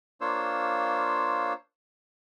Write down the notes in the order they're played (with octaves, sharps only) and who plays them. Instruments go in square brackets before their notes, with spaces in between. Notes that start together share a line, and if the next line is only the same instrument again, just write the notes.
[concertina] A#3 D4 F4 C5 C#5 E6